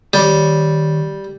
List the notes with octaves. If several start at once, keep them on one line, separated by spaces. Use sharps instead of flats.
D#3 G3 C#5